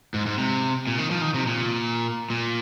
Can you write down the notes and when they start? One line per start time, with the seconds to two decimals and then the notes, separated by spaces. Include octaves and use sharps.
0.14 G#2
0.26 G#2
0.38 C3
0.87 A#2
0.98 D#3
1.11 F3
1.22 D#3
1.34 C3
1.47 A#2
2.30 A#2